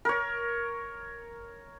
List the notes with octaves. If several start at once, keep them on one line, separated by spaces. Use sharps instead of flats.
A#4 C#5